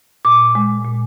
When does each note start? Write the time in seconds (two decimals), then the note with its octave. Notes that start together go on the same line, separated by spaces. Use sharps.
0.25 A#2 D6
0.55 G#3
0.85 A#2